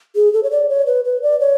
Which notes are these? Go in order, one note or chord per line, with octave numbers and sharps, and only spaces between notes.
G#4
A4
C#5
D5
C#5
B4
B4
D5
C#5